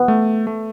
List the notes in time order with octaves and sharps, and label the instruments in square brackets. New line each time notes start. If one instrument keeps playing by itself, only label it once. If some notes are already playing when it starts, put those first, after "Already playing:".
Already playing: [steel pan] B3
[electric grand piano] A3
A3